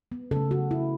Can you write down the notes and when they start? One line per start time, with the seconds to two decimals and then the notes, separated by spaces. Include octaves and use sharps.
0.12 B3
0.31 C#3 A3 A4
0.51 F#4
0.71 E4